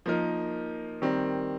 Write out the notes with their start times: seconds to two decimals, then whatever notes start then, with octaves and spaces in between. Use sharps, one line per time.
0.06 F3 A#3 D#4 A#4
1.02 D#3 G3 C4